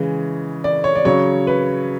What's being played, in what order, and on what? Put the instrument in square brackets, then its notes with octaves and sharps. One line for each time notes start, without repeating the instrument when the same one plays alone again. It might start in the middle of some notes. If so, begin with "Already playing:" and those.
Already playing: [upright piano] C#3 E3 G#3
D5
C#5
D5
C#3 F#3 C#5
B4